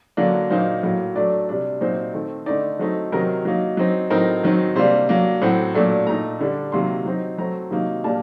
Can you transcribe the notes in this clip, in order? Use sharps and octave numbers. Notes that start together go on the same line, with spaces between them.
D3 F#3 A#3 D4
A#2 F#3 A#3 D#4 C5
A2 F#3 A#3
F#3 A3 D4 D5
C3 G3 D4
A#2 F#3 C4 D#4 C5
D#3 A3 C4
D3 A3 D#4 D5
F#3 A3 C4 D#4
C3 D#3 F#3 C4 D#4 A#4
F#3 A#3 D#4
F#3 C4 D#4
A2 F#3 C4 D#4 A#4
D#3 F#3 C4 D#4
C3 G3 A#3 D4 C5
F#3 A#3 D4
A2 F#3 C4 F#5
A#2 F#3 A3 D4
A#2 A3 D#4 A#5
D3 G3 D4
C3 D#3 F#3 A#3 C6
F#3 C4 D#4
F#3 A3 C4 A#5
C3 D#3 F#3 A#3 D#4
A#2 G3 A#3 D4 A5